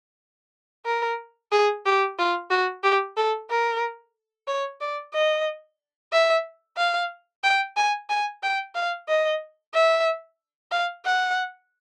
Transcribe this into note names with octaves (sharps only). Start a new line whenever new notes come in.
A#4
G#4
G4
F4
F#4
G4
A4
A#4
C#5
D5
D#5
E5
F5
G5
G#5
G#5
G5
F5
D#5
E5
F5
F#5